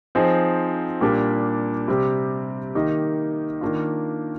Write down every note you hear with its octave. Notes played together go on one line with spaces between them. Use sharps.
F3 C4 D#4 G#4
A#2 G3 A#3 D4 G4
C3 G3 C4 G4
D#3 A#3 D#4 G4
D#3 A#3 D4 F4